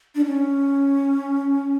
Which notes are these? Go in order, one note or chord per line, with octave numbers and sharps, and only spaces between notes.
D4
C#4